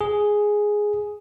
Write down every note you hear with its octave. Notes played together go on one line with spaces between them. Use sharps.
G#4